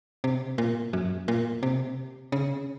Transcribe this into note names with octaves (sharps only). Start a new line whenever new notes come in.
C3
A#2
F#2
A#2
C3
C#3